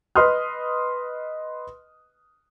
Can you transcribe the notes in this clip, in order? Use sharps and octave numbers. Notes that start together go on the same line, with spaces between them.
B4 D#5 C6 D#6 F6